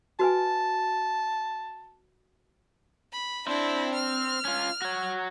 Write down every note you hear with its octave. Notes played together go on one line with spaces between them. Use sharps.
F#4 B4 G#5 A5
B5
C4 D4 E4 C5
F6
C#4 F4
F#4 C#5